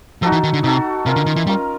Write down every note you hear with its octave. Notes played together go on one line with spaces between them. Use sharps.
F3 D#4 F#4 A4
E3
D#3
D3
C3 D#4 F#4 A4
C3 C#4 F4 A#4
D3
D#3
E3
G3 C#4 F4 A#4